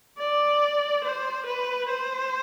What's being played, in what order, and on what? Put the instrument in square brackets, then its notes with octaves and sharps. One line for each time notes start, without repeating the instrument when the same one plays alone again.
[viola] D5
C5
B4
C5